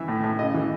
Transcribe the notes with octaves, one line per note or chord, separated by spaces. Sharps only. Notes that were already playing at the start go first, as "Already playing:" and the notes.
Already playing: E3 E5
A2
A2
C#3 D#5
E3